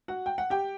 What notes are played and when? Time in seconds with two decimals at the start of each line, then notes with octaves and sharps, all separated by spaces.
0.08 F#4 F#5
0.26 G5
0.38 F#5
0.50 G4 G5